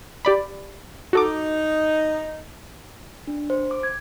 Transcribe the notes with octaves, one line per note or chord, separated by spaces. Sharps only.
G4 D5 B5
D#4 F#4 A4 D6
D4
C5
D6
G#6